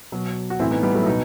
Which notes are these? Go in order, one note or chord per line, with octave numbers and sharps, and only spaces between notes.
B2 F#3
F#4
A2 E3 C4 E4
B3 D#4
G3 B3
F#3 A3
E4
B2 B3 D#4